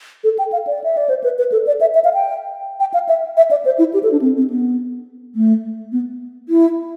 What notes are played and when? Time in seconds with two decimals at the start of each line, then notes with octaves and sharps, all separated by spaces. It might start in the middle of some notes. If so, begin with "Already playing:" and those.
0.24 A4
0.39 G5
0.52 F5
0.67 D5
0.84 E5
0.97 D5
1.09 C5
1.24 B4
1.39 B4
1.52 A4
1.67 D5
1.81 E5
1.94 E5
2.04 F5
2.14 G5
2.80 G5
2.94 F5
3.09 E5
3.37 E5
3.51 D5
3.65 C5
3.79 E4
3.94 G4
4.03 A4
4.12 D4
4.22 C4
4.36 C4
4.50 B3
5.35 A3
5.92 B3
6.49 E4